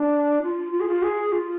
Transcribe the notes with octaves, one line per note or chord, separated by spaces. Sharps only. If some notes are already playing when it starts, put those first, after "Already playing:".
Already playing: D4
F4
F4
G#4
F4
G#4
F4